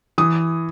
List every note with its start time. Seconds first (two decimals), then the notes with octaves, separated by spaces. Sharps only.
0.18 E3 D#6